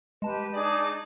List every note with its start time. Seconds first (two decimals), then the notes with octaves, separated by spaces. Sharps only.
0.22 G#3 G4 B4 A5
0.53 D4 D#4 G#4 D5